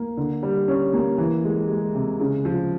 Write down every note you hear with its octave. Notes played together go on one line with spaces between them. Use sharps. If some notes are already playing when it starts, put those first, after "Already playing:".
Already playing: A#3
D3
G3
C#4
A#3
E3
G#3
G#3
C3
C#3
F3